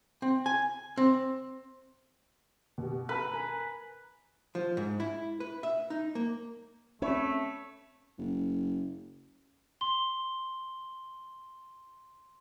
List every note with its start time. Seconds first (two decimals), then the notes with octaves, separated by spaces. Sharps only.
0.22 C4
0.46 G#5
0.97 C4
2.78 B2 G4
3.09 A4 B4 A5 A#5
3.34 A#4 G#5 A#5
4.55 F3
4.77 G#2
5.00 E4
5.40 B4
5.63 E5
5.90 D#4
6.15 A#3
7.02 A3 C4 C#4 C#5 E5 B5
8.19 F#1
9.81 C6 G7